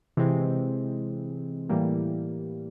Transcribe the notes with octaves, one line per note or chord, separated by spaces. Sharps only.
C3 E3 G#3 C4
A2 E3 G3 A#3